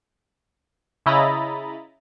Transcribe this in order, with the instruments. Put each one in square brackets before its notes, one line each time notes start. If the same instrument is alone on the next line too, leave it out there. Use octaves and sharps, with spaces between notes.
[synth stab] C#3 E4 D#5 A#5 B5 A6